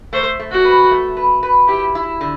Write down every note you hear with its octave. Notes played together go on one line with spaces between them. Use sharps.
A3 C5
A3
F#4
B4
A3
B4
B4
E4 G4
E4
D3